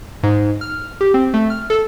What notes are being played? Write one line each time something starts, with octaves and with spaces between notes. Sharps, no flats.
G#2
F6
G4
C4
A3
F6
A4